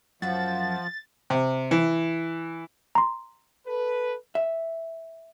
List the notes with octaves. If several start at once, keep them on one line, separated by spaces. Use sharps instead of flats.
F#2 F3 E5 F#5 A6
C3
E3
A#5 C6
A4 B4
E5